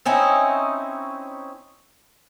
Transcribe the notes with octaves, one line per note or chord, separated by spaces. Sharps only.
C4 C#4 D#4 E4